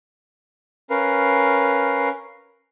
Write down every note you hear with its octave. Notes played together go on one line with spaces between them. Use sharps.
C#4 A#4 B4 F5